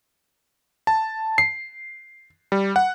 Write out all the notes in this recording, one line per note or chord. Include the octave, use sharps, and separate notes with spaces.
A5
C7
G3
F#5